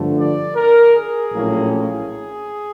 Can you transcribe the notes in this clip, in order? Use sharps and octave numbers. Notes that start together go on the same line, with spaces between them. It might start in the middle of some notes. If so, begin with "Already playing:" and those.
Already playing: G2 D3 F3 A3
D5
A#4
G#4
A#1 A2 F#3 A#3 C#4
G#4